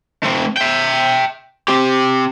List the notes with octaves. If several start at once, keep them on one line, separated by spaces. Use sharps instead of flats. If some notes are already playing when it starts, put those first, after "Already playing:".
A3 C4
E5 G5
C4 G4